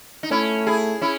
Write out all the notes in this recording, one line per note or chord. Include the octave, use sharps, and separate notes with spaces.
D#4
A3 C#4 E4
E4 G#4
C#4 E4